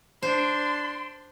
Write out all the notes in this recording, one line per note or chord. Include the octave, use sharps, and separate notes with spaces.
D4 C5 C6